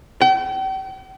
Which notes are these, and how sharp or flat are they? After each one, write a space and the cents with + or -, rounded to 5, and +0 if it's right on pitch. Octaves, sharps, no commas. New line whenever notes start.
G5 -40